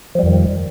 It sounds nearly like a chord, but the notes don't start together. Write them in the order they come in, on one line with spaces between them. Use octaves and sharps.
F3 G3 F2 D#3